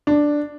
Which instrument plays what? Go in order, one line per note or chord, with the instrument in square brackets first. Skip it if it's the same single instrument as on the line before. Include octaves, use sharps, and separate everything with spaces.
[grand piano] D4